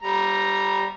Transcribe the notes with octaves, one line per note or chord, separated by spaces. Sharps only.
G3 A#5